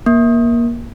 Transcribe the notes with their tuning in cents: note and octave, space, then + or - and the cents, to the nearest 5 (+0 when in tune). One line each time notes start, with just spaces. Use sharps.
A#3 +20